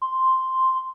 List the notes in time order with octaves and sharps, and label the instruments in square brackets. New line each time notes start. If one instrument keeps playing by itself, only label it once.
[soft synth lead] C6